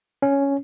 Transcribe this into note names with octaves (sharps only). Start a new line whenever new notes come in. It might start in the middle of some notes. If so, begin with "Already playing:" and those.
C#4